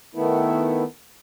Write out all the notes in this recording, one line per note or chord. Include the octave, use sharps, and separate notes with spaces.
D#3 A3 B3 E4